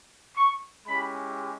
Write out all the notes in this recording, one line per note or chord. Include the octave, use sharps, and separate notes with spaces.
C#6
G#3 C#4 E4 G4 B5